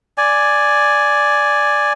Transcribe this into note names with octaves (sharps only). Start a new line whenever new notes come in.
D5 G#5